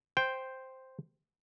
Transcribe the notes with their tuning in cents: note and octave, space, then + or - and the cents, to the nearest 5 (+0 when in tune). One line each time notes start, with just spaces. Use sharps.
C5 +0 G5 +0